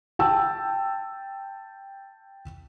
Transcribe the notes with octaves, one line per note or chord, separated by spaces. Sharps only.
G5 A5 E6